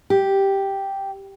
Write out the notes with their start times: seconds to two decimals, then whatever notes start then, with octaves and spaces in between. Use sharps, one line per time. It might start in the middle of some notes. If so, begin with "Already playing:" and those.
0.10 G4